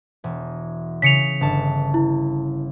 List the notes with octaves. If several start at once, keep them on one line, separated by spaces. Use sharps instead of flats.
E1
C#3 B6 C#7 D#7 F7
G1 A5
E4